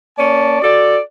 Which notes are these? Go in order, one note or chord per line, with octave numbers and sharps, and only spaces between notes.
A#3 C#4 D5 A5
F#4 A4 D5